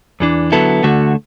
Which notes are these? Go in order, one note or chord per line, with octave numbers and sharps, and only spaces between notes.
E2 E3 D4
D3 F#3 B3 E4 A4
D2 D3 A3 F#4